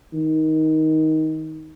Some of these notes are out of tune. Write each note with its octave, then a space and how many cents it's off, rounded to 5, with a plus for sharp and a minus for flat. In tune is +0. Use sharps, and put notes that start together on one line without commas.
D#3 +15